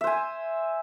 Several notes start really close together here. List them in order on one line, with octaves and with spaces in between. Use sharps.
E5 C5 G#5